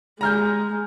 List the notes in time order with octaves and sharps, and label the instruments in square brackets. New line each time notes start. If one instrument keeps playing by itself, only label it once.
[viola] G#3 [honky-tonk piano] A#5 F6 G6